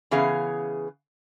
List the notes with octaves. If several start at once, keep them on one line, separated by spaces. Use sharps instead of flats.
C#3 E3 B3 G#4 F5